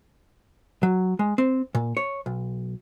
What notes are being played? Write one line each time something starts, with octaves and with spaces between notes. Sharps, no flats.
F#3
G#3
C4
A#2
C#5
B1